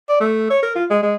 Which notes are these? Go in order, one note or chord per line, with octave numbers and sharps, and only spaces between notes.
D5
A3
C#5
A#4
F4
G#3
G#3